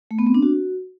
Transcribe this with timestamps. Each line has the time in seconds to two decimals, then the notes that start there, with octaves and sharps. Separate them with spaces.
0.11 A3
0.19 B3
0.27 C4
0.34 D4
0.42 F#4